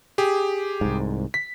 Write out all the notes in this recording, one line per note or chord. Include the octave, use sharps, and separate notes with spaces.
G4 G#4
C2 G#2
B6